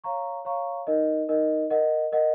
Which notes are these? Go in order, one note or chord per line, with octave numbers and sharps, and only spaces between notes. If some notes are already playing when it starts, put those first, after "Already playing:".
C#5 F5 A#5 C#6
C#5 F5 A#5 C#6
D#4 A#4 D#5
D#4 A#4 D#5
A#4 D#5 F#5
A#4 D#5 F#5